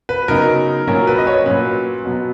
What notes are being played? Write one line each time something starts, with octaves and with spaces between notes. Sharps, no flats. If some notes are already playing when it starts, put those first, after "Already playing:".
B4
C#3 F#3 B3 D#4 A#4
A#2 F#3 C#4 A#4
B4
D#5
C#5
A#2 F#3 C#4 B4
B2 F#3 B3